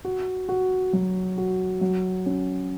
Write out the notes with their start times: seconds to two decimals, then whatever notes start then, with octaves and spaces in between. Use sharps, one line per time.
0.05 F#4
0.49 F#4
0.93 F#3
1.38 F#4
1.81 F#3
2.26 C#4